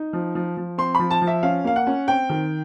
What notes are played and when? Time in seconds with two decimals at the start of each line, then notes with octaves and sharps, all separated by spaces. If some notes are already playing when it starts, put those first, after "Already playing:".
Already playing: D#4
0.13 F3
0.35 F3
0.57 F3
0.78 C4 C6
0.95 F3 B5
1.11 A5
1.22 F3
1.27 E5
1.43 C#4 F5
1.64 A#3 F5
1.76 F#5
1.87 C#4
2.08 C4 G5
2.30 D#3